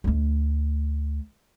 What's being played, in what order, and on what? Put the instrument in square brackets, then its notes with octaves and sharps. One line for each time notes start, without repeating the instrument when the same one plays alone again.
[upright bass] D2 A3